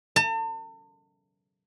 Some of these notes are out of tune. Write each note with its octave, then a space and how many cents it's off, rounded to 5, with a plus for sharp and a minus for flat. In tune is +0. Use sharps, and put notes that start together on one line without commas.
A5 +40